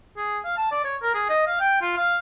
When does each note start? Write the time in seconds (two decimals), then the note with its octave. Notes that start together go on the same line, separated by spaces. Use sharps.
0.17 G#4
0.45 F5
0.57 A5
0.72 D5
0.85 C#5
1.02 A#4
1.15 G#4
1.30 D#5
1.47 F5
1.60 G5
1.82 F4
1.97 F5